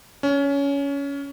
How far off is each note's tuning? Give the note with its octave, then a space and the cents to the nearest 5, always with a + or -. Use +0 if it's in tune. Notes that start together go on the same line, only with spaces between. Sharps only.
C#4 +20